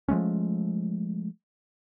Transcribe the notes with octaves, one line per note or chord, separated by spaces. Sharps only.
F3 G#3 A3 C#4